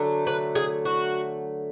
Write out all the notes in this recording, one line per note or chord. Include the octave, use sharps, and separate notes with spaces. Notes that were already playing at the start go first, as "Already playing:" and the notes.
Already playing: D3 F#3 A3
B4
G#4
F#4